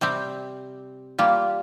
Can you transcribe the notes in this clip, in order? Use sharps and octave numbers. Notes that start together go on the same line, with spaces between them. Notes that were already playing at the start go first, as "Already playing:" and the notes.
C3 G3 C4
G3 A#3 F4